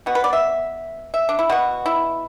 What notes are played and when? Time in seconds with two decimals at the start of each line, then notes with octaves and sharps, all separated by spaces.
0.06 B2 B3 F#4
0.15 B4
0.24 D5
0.33 E5
1.14 E5
1.29 D4
1.39 E4
1.50 B2 B3 F#4
1.86 E4